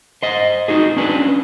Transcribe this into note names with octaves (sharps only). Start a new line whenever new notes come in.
C5 D#5
D#4 F#4 G#4
C#4 D4 B4